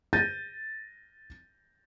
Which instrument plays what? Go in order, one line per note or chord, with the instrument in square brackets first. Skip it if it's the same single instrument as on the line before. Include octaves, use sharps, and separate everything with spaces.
[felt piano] G6 A6 A#6 D#7